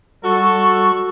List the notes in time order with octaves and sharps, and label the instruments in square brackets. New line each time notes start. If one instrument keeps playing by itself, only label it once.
[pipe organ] G3 C#6 [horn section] F#4 A4